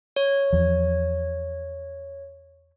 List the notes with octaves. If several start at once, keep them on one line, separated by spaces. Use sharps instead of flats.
C#5
E2 F3